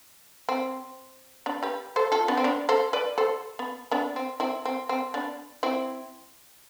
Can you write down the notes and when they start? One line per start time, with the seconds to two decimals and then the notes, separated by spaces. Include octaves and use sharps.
0.49 C4
1.46 B3 D4
1.63 G4 B4
1.96 A4 C5
2.12 F4 A4
2.28 B3 D4
2.37 C4
2.44 B3 D4
2.69 A4 C5
2.93 B4 D5
3.18 A4 C5
3.59 B3
3.91 B3 D4
4.16 C4
4.40 C4 E4
4.65 C4
4.89 C4
5.14 B3 D4
5.63 C4 E4